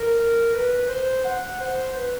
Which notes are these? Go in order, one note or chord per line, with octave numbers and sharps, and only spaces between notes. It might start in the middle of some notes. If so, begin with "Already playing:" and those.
Already playing: A#4
B4
C5
F#5
C5
B4